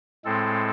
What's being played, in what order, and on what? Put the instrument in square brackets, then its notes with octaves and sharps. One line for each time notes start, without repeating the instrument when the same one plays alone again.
[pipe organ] A2 G#3 C4 A4